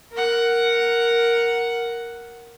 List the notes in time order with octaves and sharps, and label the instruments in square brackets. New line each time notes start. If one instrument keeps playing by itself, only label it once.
[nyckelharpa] A#4 F#5